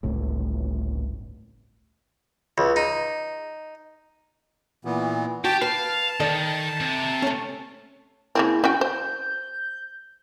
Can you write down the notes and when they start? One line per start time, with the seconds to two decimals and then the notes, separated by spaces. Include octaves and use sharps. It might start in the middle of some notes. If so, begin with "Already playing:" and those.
0.03 G1 C#2 A2
2.58 C#2
2.76 D#4
4.85 A#2 E3 B3
5.45 F#4 G4 G5 A5
5.62 B4 F5 A5
6.20 D#3 A4 D5 D#5
6.81 C3
7.22 A3 C#4
8.35 C#3 A#3 C4 E4
8.64 C#4 F#4 G5 G6
8.81 C5